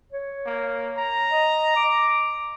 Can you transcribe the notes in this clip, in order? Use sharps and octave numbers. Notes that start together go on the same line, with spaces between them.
C#5
A#3
A#5
D#5
D6